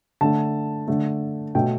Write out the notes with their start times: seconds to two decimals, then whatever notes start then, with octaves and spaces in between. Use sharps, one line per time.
0.21 D3 A3 A5
0.88 D3 A3
1.55 B2 A3 G5